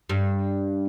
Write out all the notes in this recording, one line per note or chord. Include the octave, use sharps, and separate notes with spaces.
G2